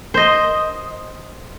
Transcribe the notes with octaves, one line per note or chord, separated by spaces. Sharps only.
C5 D#5